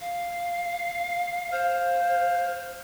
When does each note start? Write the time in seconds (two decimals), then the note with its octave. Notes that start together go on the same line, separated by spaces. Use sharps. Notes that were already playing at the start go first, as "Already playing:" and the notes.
0.01 F5
1.52 C5 F5